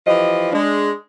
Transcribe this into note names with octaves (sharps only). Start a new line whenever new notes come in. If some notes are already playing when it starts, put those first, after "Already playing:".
E3 F3 G4 D#5
G#3 D4